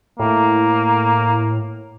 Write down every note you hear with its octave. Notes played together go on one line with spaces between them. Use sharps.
A2 A#3